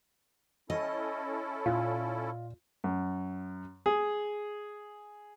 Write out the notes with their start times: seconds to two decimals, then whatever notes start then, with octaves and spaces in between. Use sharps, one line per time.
0.70 C#4 E4 A4 D#5
1.66 A#2 F4
2.84 F#2
3.86 G#4